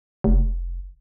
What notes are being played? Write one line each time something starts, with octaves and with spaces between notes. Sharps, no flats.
F1